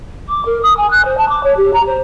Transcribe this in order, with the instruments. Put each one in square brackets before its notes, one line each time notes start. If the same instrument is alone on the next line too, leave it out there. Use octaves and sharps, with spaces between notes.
[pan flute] D6
A#4
D#6
G#5
F#6
C5
A5
D6
C#5
G4
A#5
C5